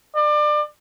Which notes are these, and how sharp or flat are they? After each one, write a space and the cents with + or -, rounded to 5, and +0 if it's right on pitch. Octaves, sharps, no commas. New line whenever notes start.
D5 +30